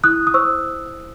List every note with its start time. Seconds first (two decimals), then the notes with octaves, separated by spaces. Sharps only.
0.04 E4 D#6 F#6
0.27 D#6
0.34 C5 C#6 E6